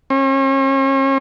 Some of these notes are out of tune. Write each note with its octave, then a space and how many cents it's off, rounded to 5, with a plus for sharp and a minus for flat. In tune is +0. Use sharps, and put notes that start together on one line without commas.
C#4 -40